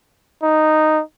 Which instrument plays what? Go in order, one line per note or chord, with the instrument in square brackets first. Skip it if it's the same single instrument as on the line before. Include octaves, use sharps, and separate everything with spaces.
[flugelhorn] D#4